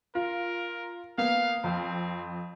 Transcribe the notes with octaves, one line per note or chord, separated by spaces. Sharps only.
F4 A#4
A#3 B3 F5
F2 C4